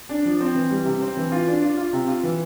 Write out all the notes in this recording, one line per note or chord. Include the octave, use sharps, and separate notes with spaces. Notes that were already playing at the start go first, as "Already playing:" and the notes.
D4
F3
C4
E3
G3
C3
C4
E3
F4
D4
F4
F4
C3
F4
E3